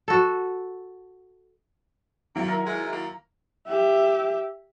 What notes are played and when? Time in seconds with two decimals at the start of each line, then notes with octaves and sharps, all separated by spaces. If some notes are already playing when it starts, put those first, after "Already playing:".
0.08 F#4 A4
2.36 D#3 F#3 A#3 E4
2.48 A#4
2.66 G#3
2.92 A#3
3.68 G4 E5